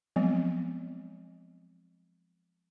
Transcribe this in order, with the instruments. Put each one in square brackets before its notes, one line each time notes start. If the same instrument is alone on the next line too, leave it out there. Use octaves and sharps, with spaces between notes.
[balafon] F3 F#3 G#3 B3 C4